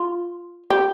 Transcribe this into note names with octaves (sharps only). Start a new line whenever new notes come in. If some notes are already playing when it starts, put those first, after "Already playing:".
Already playing: F4
G4